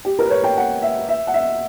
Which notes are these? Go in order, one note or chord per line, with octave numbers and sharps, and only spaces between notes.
G4
A#4
B4
C#5
G5
F#5
E5
E5
F#5
E5